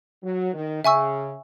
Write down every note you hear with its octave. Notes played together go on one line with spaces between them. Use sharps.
F#3
D#3
C#3 E5 G#5 C#6 E6